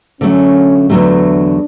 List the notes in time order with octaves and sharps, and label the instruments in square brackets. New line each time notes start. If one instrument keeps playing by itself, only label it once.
[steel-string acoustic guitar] D3 F#3 A3 [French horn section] C#4
[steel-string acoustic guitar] E2 D3 F#3 A3 [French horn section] D4